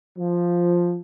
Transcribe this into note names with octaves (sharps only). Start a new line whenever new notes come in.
F3